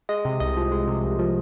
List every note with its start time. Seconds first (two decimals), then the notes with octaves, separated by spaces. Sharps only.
0.09 G#3 D#5
0.25 C3
0.40 C2 D#5
0.57 F3
0.72 G#3
0.87 C3
1.04 C2
1.19 F3